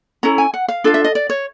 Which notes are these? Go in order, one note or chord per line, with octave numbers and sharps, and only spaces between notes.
C#4 E4 A4 A#5
G#5
F#5
F5
D4 F4 A4 F5
E5
D#5
D5
C#5